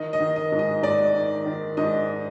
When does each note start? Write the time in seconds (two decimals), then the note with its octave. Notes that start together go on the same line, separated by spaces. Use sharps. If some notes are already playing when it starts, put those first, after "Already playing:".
Already playing: D#3 D#5
0.13 D#5
0.20 D#3
0.36 D#5
0.52 G#2
0.59 D#5
0.83 G#2 D5
1.14 D#3
1.46 D#3
1.77 G#2 D#5